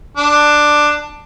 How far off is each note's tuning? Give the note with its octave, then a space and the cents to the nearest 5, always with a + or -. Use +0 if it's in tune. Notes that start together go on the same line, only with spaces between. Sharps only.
D4 +10